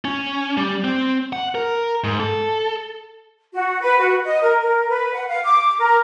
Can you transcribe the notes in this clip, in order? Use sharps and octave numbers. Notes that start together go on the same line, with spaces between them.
C#4
G3
C4
F#5
A#4
G#2
A4
F#4
B4
F#4
D#5
A#4
A#4
B4
F#5
F5
D6
A#4